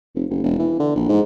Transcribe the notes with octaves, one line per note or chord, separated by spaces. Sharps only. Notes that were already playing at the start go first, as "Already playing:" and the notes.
F1
F#1
E1
E3
D3
A#1
G#2